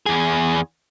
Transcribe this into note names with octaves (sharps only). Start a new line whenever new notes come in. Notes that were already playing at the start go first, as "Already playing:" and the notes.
E2 G#4